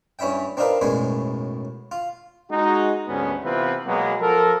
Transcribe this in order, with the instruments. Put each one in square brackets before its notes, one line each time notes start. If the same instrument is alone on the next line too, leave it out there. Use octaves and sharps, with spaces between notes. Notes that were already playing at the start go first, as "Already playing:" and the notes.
[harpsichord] G2 C#4 E4 E5 G5
C4 D4 D#4 F4 A#4 B4
B1 F#2 A2 G#3 B4 G#5
F4
[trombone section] G#3 D#4 F#4
D2 G#2 G3 B3 C#4
C3 E3 B3 C4 F4 B4
B2 F#3 G#3 A#3 B3
F3 A4 A#4